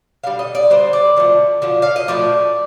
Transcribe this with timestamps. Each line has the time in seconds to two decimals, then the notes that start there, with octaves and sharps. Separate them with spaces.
0.23 D3 G3 F5
0.39 D#5
0.55 D5
0.70 D3 G3 C5
0.93 D5
1.17 D3 F3 A3
1.62 D3 F3 A3
1.82 F5
1.96 D#5
2.08 A2 F3 A3 D5